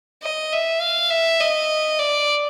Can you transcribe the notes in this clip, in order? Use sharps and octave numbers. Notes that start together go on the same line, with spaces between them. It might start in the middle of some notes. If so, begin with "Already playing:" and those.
D#5
E5
F5
E5
D#5
D5